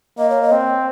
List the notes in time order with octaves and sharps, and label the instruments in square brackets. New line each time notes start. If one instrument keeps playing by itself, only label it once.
[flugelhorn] A#3 [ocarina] D#5
[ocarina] C#5
D#5
[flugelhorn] C4